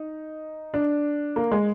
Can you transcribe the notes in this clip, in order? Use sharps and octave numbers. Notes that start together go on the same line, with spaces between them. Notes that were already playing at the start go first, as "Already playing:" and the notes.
Already playing: D#4
D4
A#3
G#3